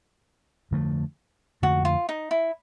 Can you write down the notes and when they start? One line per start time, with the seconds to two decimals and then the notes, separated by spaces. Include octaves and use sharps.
0.71 F2 D3 F3 A3
1.62 F2 D3 F3 A3 F#4
1.85 F4
2.09 D#4
2.31 E4